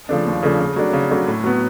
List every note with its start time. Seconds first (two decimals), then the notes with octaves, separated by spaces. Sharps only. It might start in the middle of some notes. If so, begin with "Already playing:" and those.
0.09 C#3 F3 A3 D4
0.26 D#2
0.43 C#3 F3 A3 D4
0.60 C#3
0.76 F#3 A3 D4
0.93 C#3
1.11 F#3 A3 D4
1.27 A2
1.44 F#3 B3